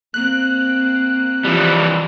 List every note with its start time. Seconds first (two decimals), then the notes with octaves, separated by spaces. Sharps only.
0.14 A#3 C4 F#6
1.45 E3 F3 G3 F4